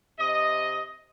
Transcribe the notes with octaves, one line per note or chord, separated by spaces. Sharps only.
C3 D#5